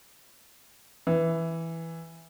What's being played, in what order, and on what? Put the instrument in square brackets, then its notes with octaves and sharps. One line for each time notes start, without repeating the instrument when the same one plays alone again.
[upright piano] E3